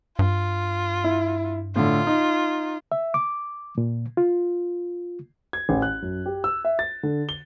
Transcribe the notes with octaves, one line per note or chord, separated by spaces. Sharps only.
G2 F4
E4
A2 D3 F4
D#4
E5
D6
A#2
F4
G#6
A1
F#6
F#2
G4
E6
E5
A6
D3
G7